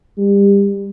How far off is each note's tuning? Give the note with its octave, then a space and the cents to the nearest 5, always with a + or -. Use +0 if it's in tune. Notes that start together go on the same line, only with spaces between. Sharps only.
G3 +30